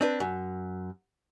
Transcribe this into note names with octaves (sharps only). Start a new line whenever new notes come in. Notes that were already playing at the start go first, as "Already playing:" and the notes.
C4 D4 B4
F#2